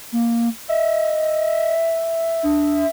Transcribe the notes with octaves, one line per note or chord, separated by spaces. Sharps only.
A#3
D#5 E5
D4